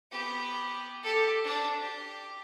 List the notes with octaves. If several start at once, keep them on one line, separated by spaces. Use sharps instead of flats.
B3 G4
G4 A4
D4 A5
G4